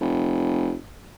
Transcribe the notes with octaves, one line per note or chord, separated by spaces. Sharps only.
F1